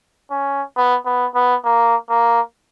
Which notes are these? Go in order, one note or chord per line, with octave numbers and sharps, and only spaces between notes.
C#4
B3
B3
B3
A#3
A#3